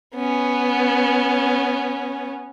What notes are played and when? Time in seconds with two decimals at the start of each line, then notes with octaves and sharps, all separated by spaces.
0.15 B3 C#4